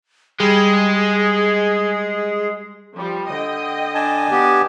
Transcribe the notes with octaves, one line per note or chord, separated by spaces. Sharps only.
G3 G#3 G#4
F3 G3
D3 D#5 G5
D4 G#5 A5
B3 G4